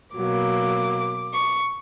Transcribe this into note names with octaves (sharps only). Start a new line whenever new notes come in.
B2 F#3 A#3 D6
C#6